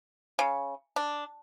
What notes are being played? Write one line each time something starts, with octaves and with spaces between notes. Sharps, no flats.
C#3
D4